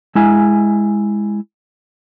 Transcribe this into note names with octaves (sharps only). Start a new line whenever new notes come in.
G#3 E4 G#5